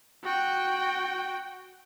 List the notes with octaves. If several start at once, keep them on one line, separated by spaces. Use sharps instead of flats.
F#4 G5